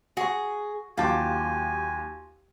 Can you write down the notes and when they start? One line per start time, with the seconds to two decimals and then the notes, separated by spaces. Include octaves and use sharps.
0.17 F#4 G#4 C#6
0.98 D#2 F#3 F4 G4 G#5 A5 D6